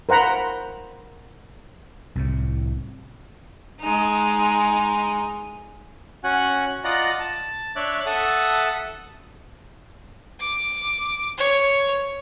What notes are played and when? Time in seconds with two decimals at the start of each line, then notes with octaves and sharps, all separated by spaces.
0.09 A#4 C5 F#5 A#5 B5
2.15 C2 A2 C3
3.80 G#3 D#4
6.24 C#4 F#4 F#5 G#5 F#6
6.84 F4 D5 D#5 F#5 A#5 F#6
7.20 A5
7.76 D4 C#5 E5 D6 F#6
8.06 A4 E5 F#5 A5 D#6
10.40 D6
11.38 C#5